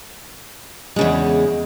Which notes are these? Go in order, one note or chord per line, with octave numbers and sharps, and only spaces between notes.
E2 C#3 G#3